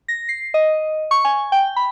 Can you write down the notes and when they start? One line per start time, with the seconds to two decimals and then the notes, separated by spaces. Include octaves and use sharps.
0.08 A#6
0.29 C7
0.54 D#5
1.11 C#6
1.25 G#5
1.52 G5
1.76 B5